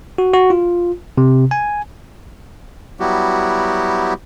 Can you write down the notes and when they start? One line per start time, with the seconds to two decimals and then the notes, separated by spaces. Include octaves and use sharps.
0.18 F#4
0.34 F#4
0.50 F4
1.18 C3
1.51 G#5
3.00 F#3 G3 B3 E4 F#4 G4